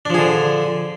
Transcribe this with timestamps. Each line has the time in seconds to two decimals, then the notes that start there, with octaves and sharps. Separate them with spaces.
0.05 D4
0.10 F3
0.14 G#4
0.19 D3